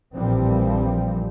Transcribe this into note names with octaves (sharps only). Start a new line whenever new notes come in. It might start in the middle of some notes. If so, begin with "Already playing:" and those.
A#1 A#2 E3 F3 G3 C4